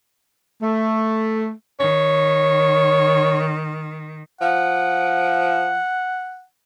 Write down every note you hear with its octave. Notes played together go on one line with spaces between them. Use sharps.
A3
D#3 C#5
F3 F#5